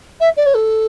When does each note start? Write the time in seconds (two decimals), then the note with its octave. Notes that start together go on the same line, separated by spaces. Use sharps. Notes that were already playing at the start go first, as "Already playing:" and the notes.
0.20 E5
0.37 D5
0.46 C#5
0.54 A4